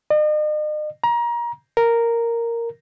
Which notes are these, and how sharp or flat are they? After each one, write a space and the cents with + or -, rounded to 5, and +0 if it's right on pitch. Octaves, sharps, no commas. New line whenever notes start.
D#5 -45
A#5 +25
A#4 -5